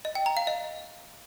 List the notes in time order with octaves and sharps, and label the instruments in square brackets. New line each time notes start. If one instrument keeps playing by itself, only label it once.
[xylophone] D#5
G5
A#5
F5
D#5